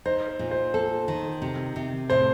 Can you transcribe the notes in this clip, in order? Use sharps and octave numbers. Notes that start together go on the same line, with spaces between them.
D#4 C5
C5
A#2
C5
A4
D#3
C3
C3
A2 C5